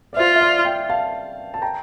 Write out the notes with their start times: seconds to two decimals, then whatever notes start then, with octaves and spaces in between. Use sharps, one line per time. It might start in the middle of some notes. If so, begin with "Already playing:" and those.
0.13 D5
0.17 F4 C5 E5
0.35 E5
0.41 D5 F5
0.65 E5 G5
0.89 F5 A5
1.54 A5
1.62 G5 A#5